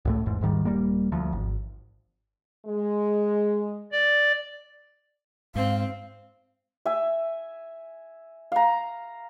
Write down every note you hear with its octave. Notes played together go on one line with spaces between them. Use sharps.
C#2 A2 A3
A1 E2 G#2
D#1 G#2 D#3 G3
D#1 G3 A#3
D2 F3
G#1
G#3
D5
G#2 C4 F5
E5 G#5
F5 A#5